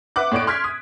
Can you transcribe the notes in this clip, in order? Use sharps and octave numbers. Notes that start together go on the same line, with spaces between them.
B4 E5 F#5 D6 F#6
A2 C#5 D5 D7
C6 F6 G#6 B6
D#6